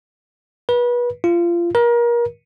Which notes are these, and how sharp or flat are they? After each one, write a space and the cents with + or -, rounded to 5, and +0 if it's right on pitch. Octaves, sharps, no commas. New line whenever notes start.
B4 -30
F4 -25
A#4 +30